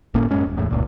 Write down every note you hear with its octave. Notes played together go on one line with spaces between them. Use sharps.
G1 A2 A#3 C#4
F#2 G#3 C#4
D#1
D1 E2 A2
F1 C#2 A#2